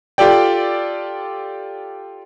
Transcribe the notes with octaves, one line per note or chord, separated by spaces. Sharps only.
F4 G4 A4 D5 G5